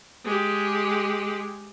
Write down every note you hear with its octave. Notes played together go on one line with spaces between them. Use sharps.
G#3 G4